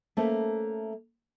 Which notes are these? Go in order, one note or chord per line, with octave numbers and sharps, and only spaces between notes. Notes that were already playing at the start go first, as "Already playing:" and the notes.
A3 A#3 C#4 A4 C5 E5